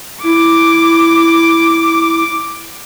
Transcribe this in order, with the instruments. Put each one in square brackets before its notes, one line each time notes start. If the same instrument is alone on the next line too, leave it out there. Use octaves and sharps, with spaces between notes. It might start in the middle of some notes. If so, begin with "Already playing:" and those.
[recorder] E4 [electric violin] D6